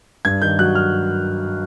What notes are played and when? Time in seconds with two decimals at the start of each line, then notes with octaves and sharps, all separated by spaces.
0.25 G2 G#6
0.42 D#3 G6
0.59 F#3 F#6
0.75 F6